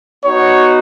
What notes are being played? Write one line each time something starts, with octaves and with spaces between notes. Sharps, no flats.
B3 D#4 F#4 C#5